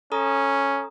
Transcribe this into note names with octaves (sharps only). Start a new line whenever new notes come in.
C#4 A4 A#5 D#6